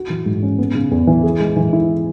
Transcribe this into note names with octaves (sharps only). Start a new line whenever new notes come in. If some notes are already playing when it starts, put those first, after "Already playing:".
Already playing: F#4
E3
G#2
C#4
B3
C#3
E2
E3
G#4
G#3
E3
E4